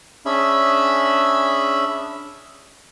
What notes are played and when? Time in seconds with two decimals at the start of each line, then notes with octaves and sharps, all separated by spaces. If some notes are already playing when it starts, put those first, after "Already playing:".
0.26 C#4 D4 G#4 E5 B5 E6